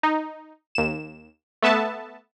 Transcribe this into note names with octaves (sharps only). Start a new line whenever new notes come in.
D#4
D#2 E7
A3 B3 E5 A5